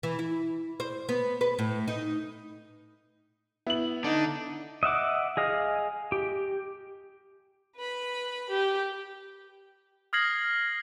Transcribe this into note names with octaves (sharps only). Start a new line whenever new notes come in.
E3
E4
C5
B3
B4
A2
D#4
B3 E4 F#7
D3 D4 D#4
D#5 E5 F#5 D6
G#4 D#5 F5
G4
B4 B5
G4
D#6 F6 G#6 A#6 C7 F#7